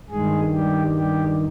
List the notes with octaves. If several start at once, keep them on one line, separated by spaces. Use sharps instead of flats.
G2 D#3 G#3 G#4
G3 G4
G3 G4